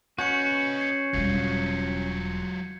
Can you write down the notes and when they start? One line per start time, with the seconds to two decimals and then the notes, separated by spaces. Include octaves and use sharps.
0.19 C#4 F#4 B4 D#5 G6 G#6 C#7
0.81 G#6 C7 C#7
1.13 E1 F#3 G3 F4 G#6